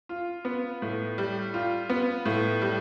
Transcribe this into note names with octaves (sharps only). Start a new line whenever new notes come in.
F4
B3
A2
G3
F4
B3
A2
G3